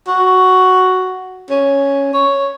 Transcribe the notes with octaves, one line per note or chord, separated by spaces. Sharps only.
F#4
C#4
C#5